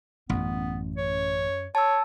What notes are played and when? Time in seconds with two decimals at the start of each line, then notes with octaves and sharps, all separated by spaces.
0.29 A1 F#2 B3 C#4
0.97 C#5
1.75 C#5 A5 E6